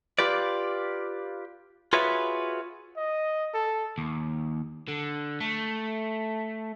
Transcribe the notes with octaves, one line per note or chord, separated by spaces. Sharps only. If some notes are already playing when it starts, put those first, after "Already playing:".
F4 G4 B4 D5
F4 F#4 G#4 B4 C#5 E5
D#5
A4
D#2
D3
A3